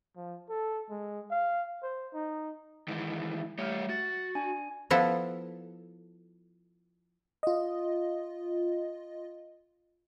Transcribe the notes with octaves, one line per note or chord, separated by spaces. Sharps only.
F3
A4
G#3
F5
C5
D#4
D#3 E3 G#3
G3 A3 G4 C#5 F6
F#4 A6
D4 G#5
F3 B3 E4 A4
F4 D#5